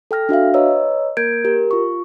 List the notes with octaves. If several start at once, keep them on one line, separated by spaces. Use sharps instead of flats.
A4 G5 F6 A#6
D4 F#4 E5 F5
B4 C#5 D#5 A#5 E6
A#3 A#4 G6 G#6 D7
G4 A#4
F4 C#6